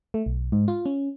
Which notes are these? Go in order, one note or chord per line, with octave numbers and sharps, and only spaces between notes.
A3
B1
G#2
F4
C#4